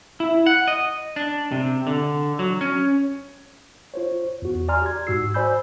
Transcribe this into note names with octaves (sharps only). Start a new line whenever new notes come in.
E4
F#5
D#5
D4
C3
D3
F#3
C#4
F4 C5 C#5
E2 F#4
D5 G#5 A#5 C6 F6
G4 G#6
G#2 F#4 E6 C7
C5 D5 G#5 B5 E6 G6